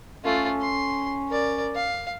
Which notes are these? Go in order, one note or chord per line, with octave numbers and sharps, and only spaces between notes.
A3 C#4 F4
C6
A#4 D5
F5